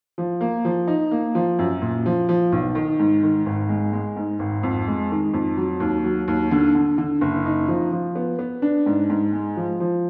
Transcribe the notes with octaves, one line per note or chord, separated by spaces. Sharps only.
F3
A#3
F3
D#4
A#3
F3
F#2
A#2
F3
F3
B1
D#3
G#2
D#3
G#1
G#3
G#3
G#2
G#1
F2
G#3
D#3
F2
F#3
D#2
F#3
D#2
D3
D3
D3
F#1
D#4
F3
F3
B3
B3
D4
G#2
G#2
G#3
F3
F3